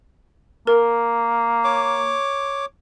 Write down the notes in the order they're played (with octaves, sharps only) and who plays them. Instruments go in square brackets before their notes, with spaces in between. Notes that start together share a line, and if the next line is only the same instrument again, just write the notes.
[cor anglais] A#3 [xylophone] A#4
[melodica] C#5 D6